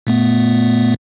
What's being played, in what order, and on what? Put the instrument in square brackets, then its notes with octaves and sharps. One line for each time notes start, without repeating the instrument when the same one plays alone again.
[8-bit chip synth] A#2 A3 B3